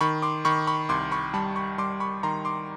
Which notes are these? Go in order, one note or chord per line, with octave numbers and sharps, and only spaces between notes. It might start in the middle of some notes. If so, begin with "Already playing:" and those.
D#3 B5 C#6
C6 D6
D#3 B5 C#6
B5 C#6
C2 C6 D6
B5 C#6
G3 A5 B5
B5 C#6
G3 C6 D6
B5 C#6
D#3 A#5 C6
C6 D6